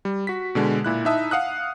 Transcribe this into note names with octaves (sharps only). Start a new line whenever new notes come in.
G3
F#4 B6
B2 D3 G#3
A#2 E4 F#6
D#4 E4 E5 A5 D#6
F5 F#5 D#6 F#6